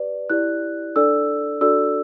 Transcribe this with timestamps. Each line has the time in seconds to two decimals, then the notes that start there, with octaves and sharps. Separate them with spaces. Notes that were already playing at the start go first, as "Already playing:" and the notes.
Already playing: G4 B4 D5
0.30 E4 G4 D5 F#6
0.96 D4 A4 D5 E6
1.61 D4 F#4 A4 D5 E6